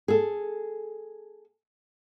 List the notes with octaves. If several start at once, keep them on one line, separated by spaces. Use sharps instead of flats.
G#4 A4